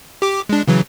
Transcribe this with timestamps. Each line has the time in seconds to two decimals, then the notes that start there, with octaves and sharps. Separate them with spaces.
0.22 G4 D6
0.49 G#3 D4
0.68 C#3 E3 F#3